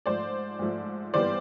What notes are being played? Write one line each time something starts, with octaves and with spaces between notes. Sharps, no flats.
G#2 F3 A3 C5 D5
G#2 F3 A3
G2 E3 G3 B3 C5 D5